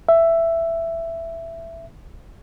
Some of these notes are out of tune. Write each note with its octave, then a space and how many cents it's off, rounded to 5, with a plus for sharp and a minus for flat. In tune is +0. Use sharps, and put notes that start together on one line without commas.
E5 +10